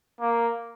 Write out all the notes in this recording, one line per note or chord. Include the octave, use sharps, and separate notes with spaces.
A#3